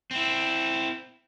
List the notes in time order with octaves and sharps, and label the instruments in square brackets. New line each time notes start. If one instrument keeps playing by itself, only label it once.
[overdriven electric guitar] C4 E4